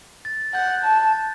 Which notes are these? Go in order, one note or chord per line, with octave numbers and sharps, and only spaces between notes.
A6
F#5 G6
F#6
G6
A5
A6